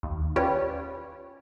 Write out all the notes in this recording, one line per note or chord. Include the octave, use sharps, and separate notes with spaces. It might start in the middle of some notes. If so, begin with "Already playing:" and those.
D#2
C#4 F4 G4 B4 C#5 D5